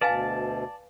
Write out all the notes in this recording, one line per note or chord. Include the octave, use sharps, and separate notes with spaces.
D2 B2 B4 D5 F5 G#5 A5